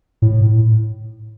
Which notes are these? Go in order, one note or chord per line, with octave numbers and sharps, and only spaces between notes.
A2